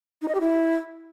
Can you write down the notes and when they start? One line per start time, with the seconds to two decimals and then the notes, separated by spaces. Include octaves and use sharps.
0.22 D#4
0.28 D#5
0.35 G4
0.41 E4